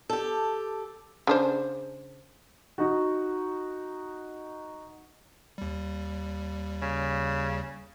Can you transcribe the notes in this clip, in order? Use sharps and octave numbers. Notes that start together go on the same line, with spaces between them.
G4 A4
C#3 D4 C5
D#4 F#4
D#2 G3
C#3